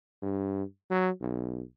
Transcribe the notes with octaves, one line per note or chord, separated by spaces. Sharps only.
G2
F#3
B1